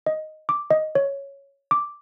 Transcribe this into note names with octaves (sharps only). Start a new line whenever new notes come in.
D#5
D6
D#5
C#5
D6